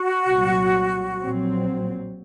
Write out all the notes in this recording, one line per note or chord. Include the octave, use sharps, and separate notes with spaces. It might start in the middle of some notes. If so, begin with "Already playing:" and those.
Already playing: F#4
C2 A#2 F#3
A#1 A#2 F#3 C4